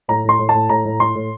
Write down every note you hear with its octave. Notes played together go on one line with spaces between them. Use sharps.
A2 A#5
A2 C6
A2
A5
A2
A2 A#5
A2
A2 C6
A2